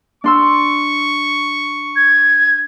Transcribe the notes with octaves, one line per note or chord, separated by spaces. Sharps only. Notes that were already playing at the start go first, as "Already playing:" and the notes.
D4 C6 C#6 E6
G#6